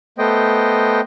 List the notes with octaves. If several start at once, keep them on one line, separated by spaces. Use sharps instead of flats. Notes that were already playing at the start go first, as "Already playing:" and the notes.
A3 B3 C5 D#5 G5